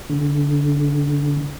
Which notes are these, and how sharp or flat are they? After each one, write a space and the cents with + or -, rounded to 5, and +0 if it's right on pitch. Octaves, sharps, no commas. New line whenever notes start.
D3 -25